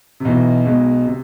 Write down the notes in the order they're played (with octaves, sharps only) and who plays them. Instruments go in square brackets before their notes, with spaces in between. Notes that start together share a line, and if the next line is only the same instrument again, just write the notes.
[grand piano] C3
[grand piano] B1 B2 [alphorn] E3
[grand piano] B1 B2 [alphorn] G#3
[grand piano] C3